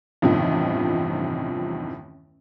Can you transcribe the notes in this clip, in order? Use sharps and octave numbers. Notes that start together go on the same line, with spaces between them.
A1 E2 G2 C3 D#3 F3